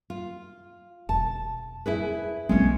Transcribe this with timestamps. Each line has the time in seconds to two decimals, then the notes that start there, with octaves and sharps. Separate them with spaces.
0.10 F4
1.09 E1 A5
1.86 E4 G#4 B4
2.49 B1 G#3 A#3 C4 C#4